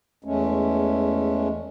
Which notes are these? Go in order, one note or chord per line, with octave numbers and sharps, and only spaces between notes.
E2 G#3 A3 C#4